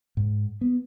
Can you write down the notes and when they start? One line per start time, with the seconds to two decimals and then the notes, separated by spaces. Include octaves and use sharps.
0.17 G#2
0.61 B3